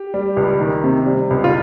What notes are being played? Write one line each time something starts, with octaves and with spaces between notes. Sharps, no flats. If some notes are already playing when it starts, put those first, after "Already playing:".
Already playing: G4
G3
C#2
D#3
C3
G3
C#2
F4